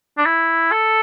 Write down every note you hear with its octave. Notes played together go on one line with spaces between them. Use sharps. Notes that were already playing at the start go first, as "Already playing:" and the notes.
D4
E4
A4